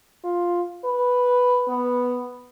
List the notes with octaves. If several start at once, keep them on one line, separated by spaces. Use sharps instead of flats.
F4
B4
B3